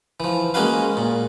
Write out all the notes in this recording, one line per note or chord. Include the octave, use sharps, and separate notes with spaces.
E3 F3
G#3 A#3 C#4 F#4 B4 F5
A#2